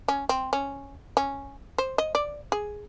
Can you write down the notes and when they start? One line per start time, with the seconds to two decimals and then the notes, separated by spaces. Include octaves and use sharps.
0.08 C#4
0.29 C4
0.53 C#4
1.17 C#4
1.78 C5
1.98 D#5
2.15 D5
2.52 G#4